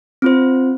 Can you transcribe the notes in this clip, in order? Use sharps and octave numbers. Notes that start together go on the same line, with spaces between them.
C4 F4 C5